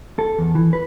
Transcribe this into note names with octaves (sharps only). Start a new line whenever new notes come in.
A4
E2
E3
B4